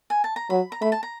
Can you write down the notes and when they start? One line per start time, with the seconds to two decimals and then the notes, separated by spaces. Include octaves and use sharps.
0.10 G#5
0.24 A5
0.36 A#5
0.50 F#3 B5
0.72 A#5
0.81 A3 B5
0.92 A5
1.03 A#5